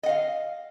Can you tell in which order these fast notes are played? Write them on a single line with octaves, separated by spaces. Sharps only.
D#5 F#5 F5